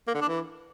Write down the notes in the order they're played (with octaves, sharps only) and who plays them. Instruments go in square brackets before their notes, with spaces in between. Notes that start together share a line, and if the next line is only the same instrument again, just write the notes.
[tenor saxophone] A#3
D3
D4
E3